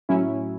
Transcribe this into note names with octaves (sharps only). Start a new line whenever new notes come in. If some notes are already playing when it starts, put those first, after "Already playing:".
A2 F#3 C#4 E4